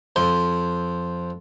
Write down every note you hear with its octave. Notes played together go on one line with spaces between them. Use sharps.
F2 C5 C6